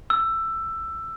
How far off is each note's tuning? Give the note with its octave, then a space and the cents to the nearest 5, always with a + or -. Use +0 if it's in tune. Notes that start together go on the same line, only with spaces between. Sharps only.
E6 +15